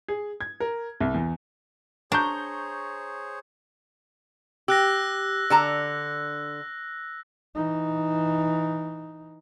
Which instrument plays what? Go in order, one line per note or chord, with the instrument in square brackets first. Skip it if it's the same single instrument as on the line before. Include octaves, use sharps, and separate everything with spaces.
[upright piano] G#4
G#6
A#4
C2
E2
[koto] D4 [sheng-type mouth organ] G#4 C5 C#5 [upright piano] A#5 C#6 G6
[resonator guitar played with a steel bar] G4 [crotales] E6 F#6 A#6
[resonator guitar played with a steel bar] D3 A5 A#5
[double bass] E3 D#4